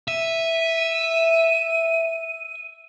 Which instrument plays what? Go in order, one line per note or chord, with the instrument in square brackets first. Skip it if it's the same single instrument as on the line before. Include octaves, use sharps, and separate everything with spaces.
[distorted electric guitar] E5 [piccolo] D#7